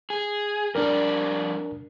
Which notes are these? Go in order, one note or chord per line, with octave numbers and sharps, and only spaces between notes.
G#4
F2 G3 D4 A#4 D5